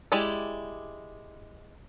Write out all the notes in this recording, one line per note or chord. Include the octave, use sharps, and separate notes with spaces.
G#3 E4 G4 D5